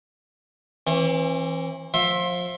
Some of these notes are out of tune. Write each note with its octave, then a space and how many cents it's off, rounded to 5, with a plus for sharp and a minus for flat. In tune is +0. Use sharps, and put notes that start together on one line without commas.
E3 +0 C4 +45
F3 +25 E5 +0 C6 +25